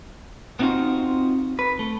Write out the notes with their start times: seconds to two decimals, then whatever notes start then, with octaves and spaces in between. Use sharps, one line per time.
0.59 B3 C4 D#4 F4 F#4 C5
1.59 B4
1.79 A3